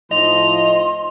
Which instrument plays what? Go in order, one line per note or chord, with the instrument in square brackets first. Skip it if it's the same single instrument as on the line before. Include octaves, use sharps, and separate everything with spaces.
[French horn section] A2 F3 D#4 [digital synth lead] D#5 [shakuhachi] C6 [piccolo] F7